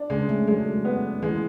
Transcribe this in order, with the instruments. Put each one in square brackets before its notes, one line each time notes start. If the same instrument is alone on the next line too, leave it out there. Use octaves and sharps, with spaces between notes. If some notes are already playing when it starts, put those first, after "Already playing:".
Already playing: [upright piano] D4
[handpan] C#3 C#4 [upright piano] G#3
[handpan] A3
[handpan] F#3 [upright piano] G#3
[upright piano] B3
[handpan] E3 [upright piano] G#3